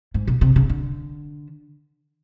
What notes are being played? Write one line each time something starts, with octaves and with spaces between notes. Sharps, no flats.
G#2
B2
C3
C#3
D3